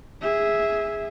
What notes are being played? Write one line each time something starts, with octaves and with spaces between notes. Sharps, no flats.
G#4 E5